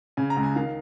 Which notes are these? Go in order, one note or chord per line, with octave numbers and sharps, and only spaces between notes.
C#3 G#5
A#5
C#2
G#5
D#3 F5